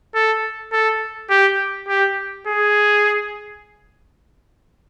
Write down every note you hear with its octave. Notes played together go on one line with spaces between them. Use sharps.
A4
A4
G4
G4
G#4